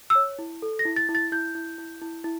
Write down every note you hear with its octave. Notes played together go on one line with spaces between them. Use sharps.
E6
C#5
E4
A4
A#6
E4
A6
E4
A6
E4 G6
E4
E4
E4
E4